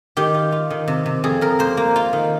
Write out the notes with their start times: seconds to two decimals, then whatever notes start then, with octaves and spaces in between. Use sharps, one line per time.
0.17 D#3 G4
0.34 F4
0.52 F4
0.70 D#3
0.88 C3
1.06 C3
1.24 F2 G#4
1.41 F2 A#4
1.59 A#3 C5
1.77 A#3
1.96 F4
2.13 D#3